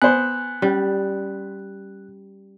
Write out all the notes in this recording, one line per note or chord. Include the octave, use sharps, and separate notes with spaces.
B3 C5 G#5 F#6
G3 C#4